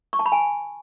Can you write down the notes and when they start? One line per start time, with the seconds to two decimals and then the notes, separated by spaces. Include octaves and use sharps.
0.13 C#6
0.19 A5
0.26 B5
0.32 G#5